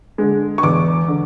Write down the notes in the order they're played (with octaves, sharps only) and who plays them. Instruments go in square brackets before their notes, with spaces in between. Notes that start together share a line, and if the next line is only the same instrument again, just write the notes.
[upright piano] D3 G#3
C#6
E2 D6
D3